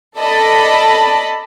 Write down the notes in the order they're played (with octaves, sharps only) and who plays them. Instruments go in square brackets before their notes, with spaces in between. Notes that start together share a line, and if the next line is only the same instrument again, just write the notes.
[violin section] A4 D5 D#5 A5 B5